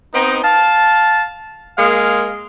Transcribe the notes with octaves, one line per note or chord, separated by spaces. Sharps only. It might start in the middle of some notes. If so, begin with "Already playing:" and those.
B3 C4 D#4
F5 A5
G#3 A#3 F5